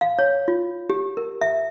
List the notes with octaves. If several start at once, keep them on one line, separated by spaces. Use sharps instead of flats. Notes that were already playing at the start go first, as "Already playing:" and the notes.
F5
C#5
F4
G4
A#4
E5